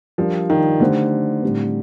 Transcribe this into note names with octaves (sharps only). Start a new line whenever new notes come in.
F3 G3 D4 F4 A#4
D#3
D3 A3 D#4 G4 C5
A2 G3 C4